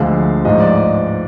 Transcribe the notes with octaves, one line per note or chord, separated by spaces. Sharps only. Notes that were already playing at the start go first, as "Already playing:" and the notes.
Already playing: D2 D3 F3 G#3 F5
A1 G#2 F3 D#5
D5
D#5